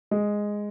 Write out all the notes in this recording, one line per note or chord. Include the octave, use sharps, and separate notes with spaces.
G#3